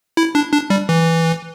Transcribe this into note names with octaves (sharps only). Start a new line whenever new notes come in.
E4
D4
D4
G3
E3